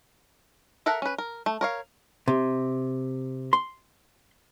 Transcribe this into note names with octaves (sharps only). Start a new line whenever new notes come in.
A4 A#4 E5 F#5 A#5
C#4 B4
A#4
A3
A#4 C#5 F5
C3
C6